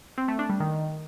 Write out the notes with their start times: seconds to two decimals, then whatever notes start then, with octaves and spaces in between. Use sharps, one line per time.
0.18 C4
0.28 A3
0.39 D4
0.50 G3
0.60 D#3